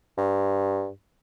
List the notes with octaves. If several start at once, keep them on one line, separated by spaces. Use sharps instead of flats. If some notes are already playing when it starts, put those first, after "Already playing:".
G2